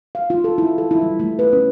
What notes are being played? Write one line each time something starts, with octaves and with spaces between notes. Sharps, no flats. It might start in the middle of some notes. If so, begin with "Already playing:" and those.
F5
F4
A4
E4
A4
E4
G3
A3
B4
C#4